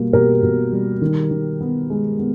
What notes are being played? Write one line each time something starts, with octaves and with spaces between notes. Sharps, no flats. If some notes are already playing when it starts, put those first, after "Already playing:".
Already playing: B2 G3 A#3
B2 G4 A#4
B2
G3
D#3
D#3
B3
G#3
B3